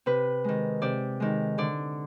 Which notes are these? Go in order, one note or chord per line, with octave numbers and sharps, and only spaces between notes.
C3 B4
D#3 G#3
C3 D5
D#3 G#3
D3 D5